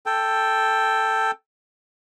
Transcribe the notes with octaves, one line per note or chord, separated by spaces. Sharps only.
A4 G5